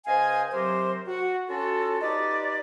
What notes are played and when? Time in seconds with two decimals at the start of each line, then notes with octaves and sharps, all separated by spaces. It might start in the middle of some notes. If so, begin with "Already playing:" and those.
0.06 C#2 C5 D#5 F5 G#5
0.52 C3 F#3 G4 A#4 C5
1.07 F#4
1.48 C#4 F4 F#4 A4
2.01 D#4 F4 G4 B4 D5